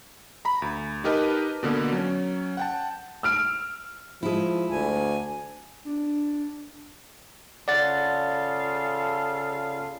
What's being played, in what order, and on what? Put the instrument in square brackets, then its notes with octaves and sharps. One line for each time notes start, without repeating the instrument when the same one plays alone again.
[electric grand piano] A#5 B5
D2
D#4 G4 A#4 B4 D#5 A5
B2 D3 A#3 B3
F#3 C#4
F#5 G5 A5
[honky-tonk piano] E6 F6 D7
[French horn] F3 [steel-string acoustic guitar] G#3 E4
[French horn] D2 [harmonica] G#5
[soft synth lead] D4
[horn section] C#3 F4 A4 [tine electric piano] D5 F#5 A6